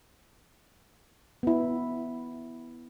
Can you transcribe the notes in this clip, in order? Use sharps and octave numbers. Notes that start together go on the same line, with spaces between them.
B3 E4